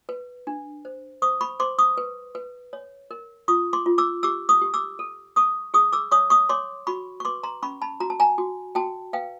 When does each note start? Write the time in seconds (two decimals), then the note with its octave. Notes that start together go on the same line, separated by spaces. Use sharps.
0.09 B4
0.47 D4
0.85 C5
1.22 C5 C#6 D#6
1.41 B5 C#6
1.60 C5 C6 D6
1.78 C#6 D#6
1.97 B4
2.35 B4
2.73 C#5
3.11 A#4
3.48 F4 C#6 D#6
3.73 C6 D6
3.86 F4
3.98 D6 E6
4.23 G4 D6 E6
4.49 C#6 D#6
4.61 G4
4.74 D6 E6
4.99 A4
5.36 A4 C#6 D#6
5.74 G#4 C#6 D#6
5.93 D6 E6
6.11 C#5 C#6 D#6
6.30 C#6 D#6
6.49 C#5 C6 D6
6.87 F#4 B5 C#6
7.20 C#6
7.25 B4 C6 D6
7.43 A#5 C6
7.63 C#4 B5 C#6
7.82 A5 B5
8.00 F#4 A#5
8.10 A5
8.20 G#5 A#5
8.38 F#4
8.75 F#4 G5 A5
9.13 B4 F5 G5